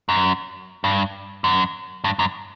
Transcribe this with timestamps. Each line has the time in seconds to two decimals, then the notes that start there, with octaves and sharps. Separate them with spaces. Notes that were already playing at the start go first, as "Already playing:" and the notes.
0.09 F#2
0.84 G2
1.44 F#2
2.04 G2
2.19 F#2